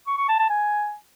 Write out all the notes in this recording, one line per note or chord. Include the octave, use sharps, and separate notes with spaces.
C#6
C#6
A5
A5
G#5